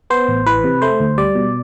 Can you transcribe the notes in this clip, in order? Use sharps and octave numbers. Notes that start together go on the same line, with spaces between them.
B3 C5
A1
E3 B4
C3
A3 C5
D2
G3 D5
B2